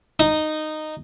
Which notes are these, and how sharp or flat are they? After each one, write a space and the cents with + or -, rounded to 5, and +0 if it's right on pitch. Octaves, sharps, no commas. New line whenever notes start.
D#4 -10